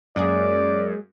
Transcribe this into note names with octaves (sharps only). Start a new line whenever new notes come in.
F#2 G#3 A#3 G#4 D5